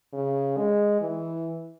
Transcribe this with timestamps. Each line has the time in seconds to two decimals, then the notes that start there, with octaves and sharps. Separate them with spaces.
0.13 C#3
0.57 G#3
1.01 E3